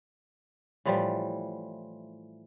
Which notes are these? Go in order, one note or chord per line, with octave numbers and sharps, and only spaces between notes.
A2 E3 F3 G3